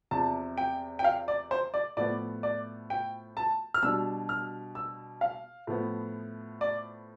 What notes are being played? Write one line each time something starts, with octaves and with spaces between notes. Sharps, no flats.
E2 C3 F3 A5
G5
G5
F5
D5
C5
D5
A2 F3 B3 D5
D5
G5
A5
F6
B2 G3 D4 E6
F6
E6
F5
A2 F3 B3
D5